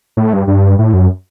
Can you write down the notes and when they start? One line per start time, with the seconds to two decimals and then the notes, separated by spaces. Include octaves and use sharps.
0.17 A2
0.33 G2
0.47 G2
0.79 A2
0.93 F#2